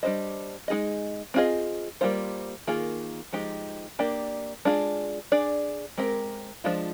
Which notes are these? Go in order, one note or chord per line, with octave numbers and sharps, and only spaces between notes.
G3 D4 G#4 C5 D#5
G#3 D#4 G#4 D#5
C4 F4 G#4 D#5
G3 A#3 F4 C5
D#3 A#3 F4 G#4
F3 G#3 D#4 G4
A#3 D4 G4 D5
G#3 D4 F4 G#4
D4 G#4 D5
G#3 C4 G4 A#4
F3 G#3 D4 F4